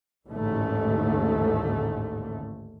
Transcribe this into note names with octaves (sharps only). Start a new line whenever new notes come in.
A1 D#2 G#2 D3 A3